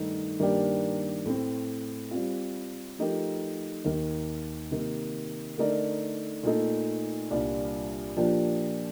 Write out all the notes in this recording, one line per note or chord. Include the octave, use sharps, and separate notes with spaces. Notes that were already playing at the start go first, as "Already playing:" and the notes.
Already playing: G2 D#3 A3 D#4
G2 D#3 A#3 D4 G4
A2 A3 C4
G3 C4 F4
F3 A3 D#4 G4 A#4
D#2 D#3 A#3
C3 D#3 A#3
D3 A3 D#4 A#4 D5
A#2 A3 D#4 A4
C2 A#2 G3 D4 F4
A#2 F3 A#3 D4 G4